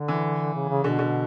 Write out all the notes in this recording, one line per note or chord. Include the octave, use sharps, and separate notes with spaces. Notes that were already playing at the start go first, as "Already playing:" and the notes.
Already playing: D3
E3
C#3
C#3
B2 D3
D3